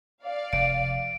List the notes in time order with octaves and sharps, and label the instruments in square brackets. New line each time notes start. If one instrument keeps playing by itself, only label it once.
[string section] D5 F5
[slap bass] F1 [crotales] D7